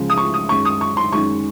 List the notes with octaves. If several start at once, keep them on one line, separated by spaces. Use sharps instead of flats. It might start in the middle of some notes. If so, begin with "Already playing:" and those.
Already playing: C#2 C#3 F3 G#3
D#6
C#6
D#6
F#2 D#3 G#3 C#6
D#6
C#6
C6
F#2 D#3 G#3 C#6